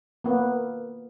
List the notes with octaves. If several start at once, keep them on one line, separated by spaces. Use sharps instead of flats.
A#3 B3